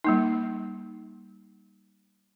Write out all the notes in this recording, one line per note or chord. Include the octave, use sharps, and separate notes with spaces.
G3 A#3 D#4